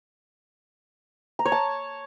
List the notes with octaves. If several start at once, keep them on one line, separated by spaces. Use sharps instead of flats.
A#5
C#5
A5